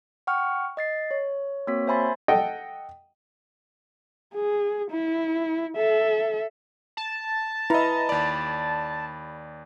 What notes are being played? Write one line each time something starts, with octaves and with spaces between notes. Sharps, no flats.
F#5 G5 C#6 F6
D#5 A6 C7
C#5
A#3 C4 F#4 C#5 B6
C5 E5 G#5 B5 C6 A6
A4 D#5 F#5 G5
G#4
E4
A4 E5
A5
E4 B4 D#5 A#5 B5
D#2 D5 B5